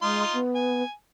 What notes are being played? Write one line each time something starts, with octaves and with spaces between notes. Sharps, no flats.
G#3 D#4 F4 C6
B3
G#5